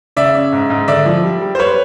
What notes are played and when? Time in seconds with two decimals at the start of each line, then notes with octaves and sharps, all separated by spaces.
0.16 C#3 D5 E5
0.35 C#4
0.52 G#2
0.70 G#2
0.88 D3 D5 E5
1.06 F3
1.23 G3
1.42 G3
1.55 C5
1.59 G3 B4 C#5